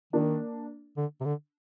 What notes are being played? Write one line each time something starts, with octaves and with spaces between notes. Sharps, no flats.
D#3 A#3 D4
D3
C3
D3